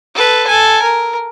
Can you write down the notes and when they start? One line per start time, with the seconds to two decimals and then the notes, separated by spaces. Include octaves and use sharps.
0.15 A4 B4
0.47 A4 G#5
0.83 A#4